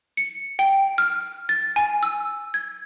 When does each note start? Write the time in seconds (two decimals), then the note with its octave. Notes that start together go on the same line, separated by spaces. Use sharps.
0.17 C#7
0.59 G5
0.98 F6
1.49 A6
1.76 G#5
2.03 E6
2.54 G#6